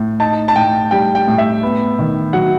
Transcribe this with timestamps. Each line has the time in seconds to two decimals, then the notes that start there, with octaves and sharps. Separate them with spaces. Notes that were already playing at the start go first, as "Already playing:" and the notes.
Already playing: A2
0.20 D#4 A5
0.48 A5
0.55 A2 G5
0.91 G3 G5
1.15 G5
1.28 A2
1.38 E5
1.63 B3
1.99 D#3
2.33 F#3 F#5